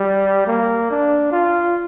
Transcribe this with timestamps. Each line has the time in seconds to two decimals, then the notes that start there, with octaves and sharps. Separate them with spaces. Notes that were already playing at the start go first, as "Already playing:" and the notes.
Already playing: G3
0.47 A#3
0.90 D4
1.31 F4